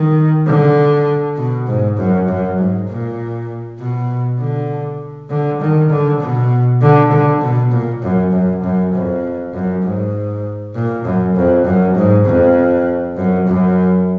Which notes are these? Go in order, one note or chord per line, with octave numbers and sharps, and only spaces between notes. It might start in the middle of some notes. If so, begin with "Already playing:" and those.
Already playing: D#3
D3
B2
G#2
F#2
F#2
G#2
A#2
B2
D3
D3
D#3
D3
B2
D3
D3
B2
A#2
F#2
F#2
F#2
F2
F#2
G#2
A#2
F#2
F2
F#2
G#2
F2
F#2
F#2